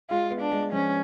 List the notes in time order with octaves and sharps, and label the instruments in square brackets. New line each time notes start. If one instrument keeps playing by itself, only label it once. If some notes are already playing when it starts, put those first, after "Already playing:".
[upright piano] G#3 [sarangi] F4
[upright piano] B3
[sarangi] D4
[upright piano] G#3
[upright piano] F3 [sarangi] C#4